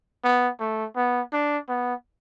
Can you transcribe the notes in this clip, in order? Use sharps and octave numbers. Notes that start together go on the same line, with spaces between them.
B3
A3
B3
D4
B3